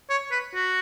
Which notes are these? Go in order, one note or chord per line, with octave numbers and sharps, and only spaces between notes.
C#5
B4
F#4